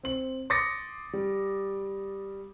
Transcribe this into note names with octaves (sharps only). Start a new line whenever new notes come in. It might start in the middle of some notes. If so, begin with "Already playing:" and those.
C4 F#7
C6 D6 D#6 A6 A#6 C#7
G3